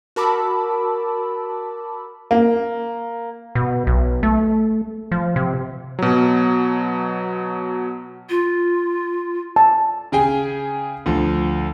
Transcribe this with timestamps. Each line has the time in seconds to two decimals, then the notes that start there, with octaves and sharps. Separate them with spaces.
0.16 F#4 A#4 A5 B5 D6 E6
2.31 A#3
3.55 B2
3.87 B1
4.23 A3
5.12 F3
5.36 C3
5.99 B2 F#3
8.30 F4
9.56 A5
10.12 C#3 G#4 G5 G#5
11.06 D2 F3